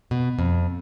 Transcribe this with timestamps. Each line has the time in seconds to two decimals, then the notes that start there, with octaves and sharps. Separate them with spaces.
0.11 B2
0.39 F2